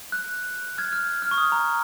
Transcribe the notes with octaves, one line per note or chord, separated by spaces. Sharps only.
F#6
F6 G#6
F6
F6
C#6
D#6
A#5